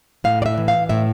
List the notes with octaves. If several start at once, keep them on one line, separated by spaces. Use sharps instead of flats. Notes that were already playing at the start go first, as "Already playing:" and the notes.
A2 F5
D5
E5
E3
F5
A2 E5